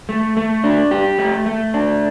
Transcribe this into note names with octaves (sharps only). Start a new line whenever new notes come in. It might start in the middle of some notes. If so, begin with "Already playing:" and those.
A3
A3
D4
G4
A3
A3
D4